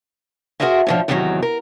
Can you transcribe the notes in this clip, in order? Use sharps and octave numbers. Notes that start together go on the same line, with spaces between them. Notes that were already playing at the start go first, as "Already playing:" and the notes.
F#4 G#4 A#4 C5 D#5 E5
A2 D3 F3
E2 A2 C3 D#3 E3 F#3
A#4